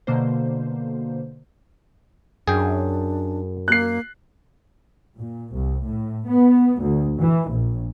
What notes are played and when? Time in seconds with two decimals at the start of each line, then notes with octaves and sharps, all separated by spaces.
0.07 B2 D3 A#3 C5
2.47 F#2 D4 G#4 G5
3.68 A#3 F#6 C7
5.18 A#2
5.53 C2
5.85 A2
6.27 B3
6.80 D2
7.19 E3
7.50 A#1